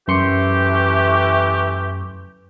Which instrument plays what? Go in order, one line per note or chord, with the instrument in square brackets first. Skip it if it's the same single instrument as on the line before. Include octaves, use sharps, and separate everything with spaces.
[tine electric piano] F#2 C6 C#7 [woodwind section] E3 A3 G4